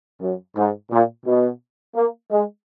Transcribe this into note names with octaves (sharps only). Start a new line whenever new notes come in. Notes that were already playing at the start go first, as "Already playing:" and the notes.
F#2
G#2
A#2
B2
A#3
G#3